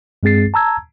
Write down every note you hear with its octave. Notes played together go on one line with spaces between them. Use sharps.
G2 G#3 C4 G#4 A6 C7
A5 A#5 E6 G#6